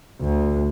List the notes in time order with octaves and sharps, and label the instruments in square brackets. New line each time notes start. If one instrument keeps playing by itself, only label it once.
[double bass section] D2